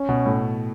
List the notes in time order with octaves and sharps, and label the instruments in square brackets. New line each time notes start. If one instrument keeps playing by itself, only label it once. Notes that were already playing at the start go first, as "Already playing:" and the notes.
Already playing: [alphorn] C#4
[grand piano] B2
A2